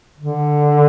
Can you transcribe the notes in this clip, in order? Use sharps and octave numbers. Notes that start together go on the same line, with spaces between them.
D3